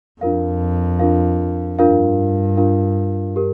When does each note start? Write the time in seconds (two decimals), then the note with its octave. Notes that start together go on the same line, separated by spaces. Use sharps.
0.21 F2 D4 F4 A#4 F5
0.99 D4 F4 A#4 F5
1.79 G2 D4 F4 A#4 F5
2.57 D4 F4 A#4 F5
3.36 G4 A#4